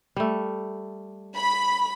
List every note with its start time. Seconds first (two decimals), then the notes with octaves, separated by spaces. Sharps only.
0.16 G3 A3
1.35 B5